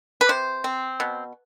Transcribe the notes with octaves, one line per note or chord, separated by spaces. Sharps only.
B4
C3 C5
C4
B2